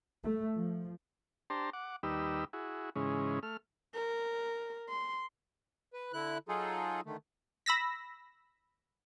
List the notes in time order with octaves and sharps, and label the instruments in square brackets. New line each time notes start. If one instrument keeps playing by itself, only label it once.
[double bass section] A3
F3
[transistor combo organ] D4 G4 C5 A5 A#5 C6
F#5 D6
D#2 G3 D#4 G4 B4 E6
E4 F#4 G#4
G#2 C#3 E3 G#3 C#4
A3 F6
[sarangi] A#4
C6
[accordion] B4
D3 E4 F#6
F#3 D#4 F4 G#4 A4
D3 D#3 A3
[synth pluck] B5 E6 A#6 B6